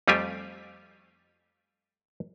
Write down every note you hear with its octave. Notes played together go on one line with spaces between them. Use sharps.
F2 G3 A3 F4 G4 G#5